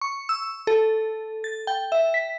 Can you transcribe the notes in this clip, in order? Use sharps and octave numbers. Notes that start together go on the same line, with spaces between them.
C#6
E6
A4
A6
G5
E5
B6